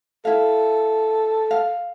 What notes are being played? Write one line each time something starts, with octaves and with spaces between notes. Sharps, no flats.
E4 A4 F5
F5